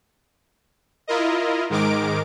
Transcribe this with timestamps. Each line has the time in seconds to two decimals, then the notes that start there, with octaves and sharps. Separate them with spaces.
1.07 E4 F4 A#4 D#5
1.70 G#2 D#3 G#3 A#4 D6 D7